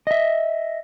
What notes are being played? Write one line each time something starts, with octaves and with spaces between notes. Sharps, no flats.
D#5 E5